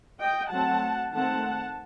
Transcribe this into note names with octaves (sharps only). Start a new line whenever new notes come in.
D#5 G5
F#3 A3 C4 F#5 A5
D#3 A3 C4 F#5 A5